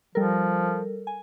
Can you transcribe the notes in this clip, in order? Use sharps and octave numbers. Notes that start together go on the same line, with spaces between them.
F3 G3 A4 A#4
G#5